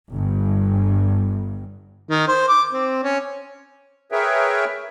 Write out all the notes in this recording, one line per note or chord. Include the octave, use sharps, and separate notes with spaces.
G1 G2
D#3
C5
D6
C4
C#4
G#4 A#4 B4 C#5 E5 G5